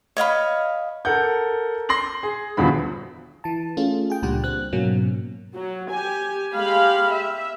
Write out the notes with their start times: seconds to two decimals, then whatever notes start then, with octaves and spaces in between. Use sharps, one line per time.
0.17 C#5 D#5 F5 B5
1.05 A4 A#4 F#5 G6
1.89 C6 A#6 C7 F#7
2.23 G#4
2.57 D#1 E2 D3 F3 F#4 B5
3.44 E3 A5
3.77 A3 C#4 F4 G#4
4.10 G#4 G5
4.22 C#2 A#2 G3 D4 G4 F#5
4.44 C4 F#6
4.72 G#2 B2 F#3 A#3 C#4
5.55 F#3
5.91 G4 G#5
6.53 G#3 G4 F5 B5
7.10 E5